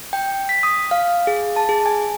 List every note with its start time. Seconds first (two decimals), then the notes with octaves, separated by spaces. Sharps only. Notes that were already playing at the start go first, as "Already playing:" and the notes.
0.13 G5
0.49 B6
0.63 D#6
0.91 F5
1.27 G#4
1.56 A5
1.69 G#4
1.86 G#5